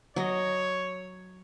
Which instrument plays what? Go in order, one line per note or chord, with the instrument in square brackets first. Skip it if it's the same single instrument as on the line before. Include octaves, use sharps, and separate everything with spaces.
[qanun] F#3 D#5 [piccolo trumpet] C#5